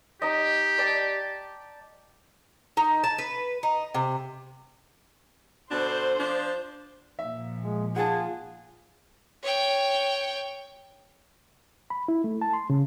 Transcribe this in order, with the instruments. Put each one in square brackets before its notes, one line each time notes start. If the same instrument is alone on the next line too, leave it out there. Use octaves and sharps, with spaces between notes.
[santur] D#4 D#5 [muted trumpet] G4
[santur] D5 G5 A5
[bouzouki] D#4
A5
B4
D#4
C3
[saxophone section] B2 D3 D4 [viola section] C5
[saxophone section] F3 D4
[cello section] A#2 F3 [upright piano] E5
[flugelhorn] G#3
[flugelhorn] F4 [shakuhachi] G#4 [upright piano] F#5 G#5 A5
[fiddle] C#5 G5
[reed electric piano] B5
E4
A3
A5
C6
C#3